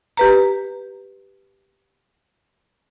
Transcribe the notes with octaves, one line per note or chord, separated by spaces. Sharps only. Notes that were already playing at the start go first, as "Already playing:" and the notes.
G4 B4 A#5